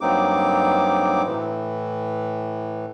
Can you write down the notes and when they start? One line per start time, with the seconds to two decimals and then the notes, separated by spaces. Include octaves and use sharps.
0.01 G2 F#3 A#3 C4 D#4 D6
1.26 A2 E3